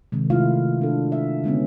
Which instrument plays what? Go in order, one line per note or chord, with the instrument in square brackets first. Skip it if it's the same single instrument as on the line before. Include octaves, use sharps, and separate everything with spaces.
[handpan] C3 D#3 G#3
C3 G#3 A3 E4 F4 F5
D4 A4
E5
D3 G#3 B3 C#4